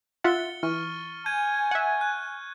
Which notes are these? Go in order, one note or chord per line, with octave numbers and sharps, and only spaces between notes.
F4 E5 F#5 A6 C#7 G7
E3 C#6 F6
G#5 G6 G#6 D#7
E5 F#5
F#6